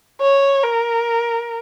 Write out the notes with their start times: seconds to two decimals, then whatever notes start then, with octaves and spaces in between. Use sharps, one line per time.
0.21 C#5
0.64 A#4